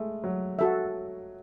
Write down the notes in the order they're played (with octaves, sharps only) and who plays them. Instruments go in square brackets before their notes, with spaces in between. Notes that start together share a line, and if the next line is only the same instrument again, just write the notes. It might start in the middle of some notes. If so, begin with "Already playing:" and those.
Already playing: [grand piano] G#3 A3
F#3
[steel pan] F#4 A4 E5